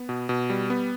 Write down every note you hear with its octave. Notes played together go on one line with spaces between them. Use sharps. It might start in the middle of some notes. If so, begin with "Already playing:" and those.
Already playing: B3
B2
B2
G3
B3